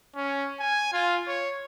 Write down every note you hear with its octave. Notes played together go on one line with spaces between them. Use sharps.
C#4
G#5
F4
C#5